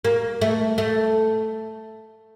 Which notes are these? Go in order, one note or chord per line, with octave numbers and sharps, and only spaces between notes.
A#3
A3
A3